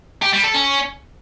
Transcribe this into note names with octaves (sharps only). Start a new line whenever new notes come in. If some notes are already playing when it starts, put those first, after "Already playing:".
G4
G3
A4
C#4